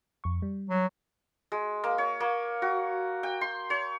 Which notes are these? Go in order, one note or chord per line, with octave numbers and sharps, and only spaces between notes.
F2 C#6
G3
F#3
G#3
A#3
C#5
A#3
F#4
G5
C6
C#5